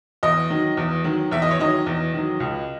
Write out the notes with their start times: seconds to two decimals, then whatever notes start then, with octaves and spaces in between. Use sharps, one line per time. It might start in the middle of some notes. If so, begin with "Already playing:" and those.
0.23 E2 D#5
0.50 D#3 F#3
0.77 E2
1.04 D#3 F#3
1.31 E2 E5
1.42 D#5
1.51 C#5
1.59 D#3 F#3 D#5
1.86 E2
2.14 D#3 F#3
2.40 C#2